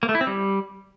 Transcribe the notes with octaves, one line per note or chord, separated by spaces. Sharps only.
A#3
A3
E4
C4
G3